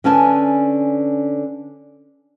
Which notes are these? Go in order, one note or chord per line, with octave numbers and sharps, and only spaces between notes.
D3 C#4 B4 G#5 A5